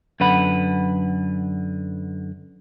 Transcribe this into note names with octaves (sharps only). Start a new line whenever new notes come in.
F#2 D3 B4 F#5 B5